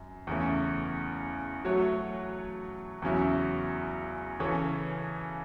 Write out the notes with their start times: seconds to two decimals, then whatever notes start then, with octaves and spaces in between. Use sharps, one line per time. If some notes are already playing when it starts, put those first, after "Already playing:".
Already playing: F#2
0.27 E2 C#3 A3 C#4
1.64 F#3 A3 F#4 C#5
3.02 E2 C#3 F#3 C#4 E4
4.40 C#3 E3 C#4 A4 C#5